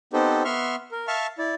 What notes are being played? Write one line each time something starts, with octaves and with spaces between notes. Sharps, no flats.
B3 C4 D#4 G4 A4 C5
B3 E5 C6 C#6 F6
A#4
E5 F5 A5 C#6 F6
E4 D5